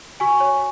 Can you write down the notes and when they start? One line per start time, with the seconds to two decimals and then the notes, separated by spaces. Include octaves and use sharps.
0.20 F#4 G#5 C#6
0.40 C#5